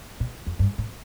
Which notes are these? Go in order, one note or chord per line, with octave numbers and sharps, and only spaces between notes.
A#2
F2
G2
A2